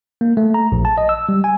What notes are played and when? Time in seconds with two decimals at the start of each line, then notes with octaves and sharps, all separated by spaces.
0.21 A#3
0.37 A3
0.54 A#5
0.72 A#1
0.85 A5
0.98 D#5
1.09 E6
1.29 G3
1.44 G#5